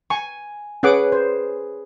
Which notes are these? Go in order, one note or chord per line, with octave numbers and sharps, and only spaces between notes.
G#5 C#6
C#4 G#4 B4 F#5 D6
C5